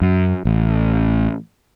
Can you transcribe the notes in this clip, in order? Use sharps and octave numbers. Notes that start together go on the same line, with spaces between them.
F#2
A1